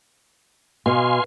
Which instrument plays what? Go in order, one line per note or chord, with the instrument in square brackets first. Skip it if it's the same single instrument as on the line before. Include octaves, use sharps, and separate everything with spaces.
[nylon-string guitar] B2 B3 [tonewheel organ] F5 G#5 C6